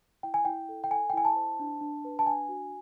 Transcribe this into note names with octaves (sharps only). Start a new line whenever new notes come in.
E4 G5
G#5
E4 G5
A4
G5
A4 G#5
G5
E4 G#5
A5
C5
D4
D4
B4
A5
D4 G#5
F#4